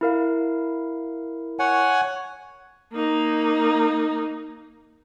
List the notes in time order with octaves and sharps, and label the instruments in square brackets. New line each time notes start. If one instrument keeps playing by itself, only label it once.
[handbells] E4 A#4 F5
[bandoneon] C#5 F#5 G#5
[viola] A#3 D#4